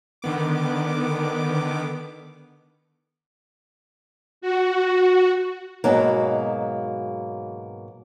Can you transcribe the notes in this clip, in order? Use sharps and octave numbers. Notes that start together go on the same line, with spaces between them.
D3 D#3 B3 D6
F#4
G#2 B2 F#3 A#3